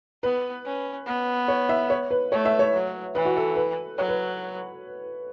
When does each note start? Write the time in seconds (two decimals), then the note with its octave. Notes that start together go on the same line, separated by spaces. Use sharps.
0.23 B3 B4
0.65 C#4
1.06 B3
1.48 C#5
1.69 E5
1.90 C#5
2.11 B4
2.32 A3 C#5
2.45 E5
2.59 C#5
2.73 F#3
3.15 E3 B4
3.25 F#4
3.36 A4
3.56 B4
3.98 F#3 C#5
4.08 B4